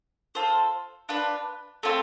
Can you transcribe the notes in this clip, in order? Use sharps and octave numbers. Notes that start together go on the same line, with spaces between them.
F4 A4 C5
D4 F4 B4
A3 C4 F4